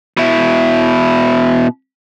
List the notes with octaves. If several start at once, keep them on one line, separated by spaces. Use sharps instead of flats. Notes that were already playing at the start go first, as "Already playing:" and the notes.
B2 E4